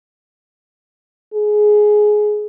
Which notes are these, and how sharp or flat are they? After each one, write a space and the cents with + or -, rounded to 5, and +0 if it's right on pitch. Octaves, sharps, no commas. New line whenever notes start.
G#4 +15